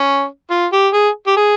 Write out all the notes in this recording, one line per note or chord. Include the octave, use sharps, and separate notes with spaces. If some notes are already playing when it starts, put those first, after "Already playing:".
Already playing: C#4
F4
G4
G#4
G4
G#4